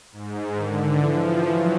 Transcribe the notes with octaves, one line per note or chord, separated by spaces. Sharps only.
G#2
D3 D#3
E3 F3
E3 F#3